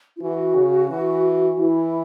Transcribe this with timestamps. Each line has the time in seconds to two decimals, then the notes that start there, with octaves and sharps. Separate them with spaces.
0.16 E4
0.21 E3 F#4
0.55 C#3
0.90 E3
1.58 E3 E4